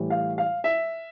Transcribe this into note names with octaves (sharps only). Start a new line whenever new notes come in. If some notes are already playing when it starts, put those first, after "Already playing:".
Already playing: A2 E3 G3
F5
F5
E5